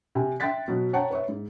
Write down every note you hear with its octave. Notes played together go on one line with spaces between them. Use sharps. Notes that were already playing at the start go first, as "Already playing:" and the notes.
C3 G#5
E5 G5 C6 F#6 A6 B6
B2 F#3
C#5 F#5 G5 A5 A#5
B4 C#5 E5
G#2